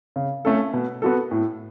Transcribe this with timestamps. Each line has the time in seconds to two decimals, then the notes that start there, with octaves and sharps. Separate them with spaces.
0.16 C#3
0.45 A3 C#4 A4
0.73 B2
1.02 B3 F#4 A4
1.31 A2